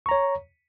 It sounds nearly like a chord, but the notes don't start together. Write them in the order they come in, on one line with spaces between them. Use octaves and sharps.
C#6 A#5 C#5